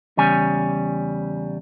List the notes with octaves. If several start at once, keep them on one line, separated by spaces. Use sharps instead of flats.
E2 C#3 G3 C#4 G#5